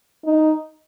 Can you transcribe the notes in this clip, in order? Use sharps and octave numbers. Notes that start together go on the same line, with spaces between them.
D#4